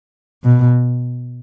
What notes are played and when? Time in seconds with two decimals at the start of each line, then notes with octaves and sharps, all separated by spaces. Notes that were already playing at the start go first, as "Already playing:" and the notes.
0.44 B2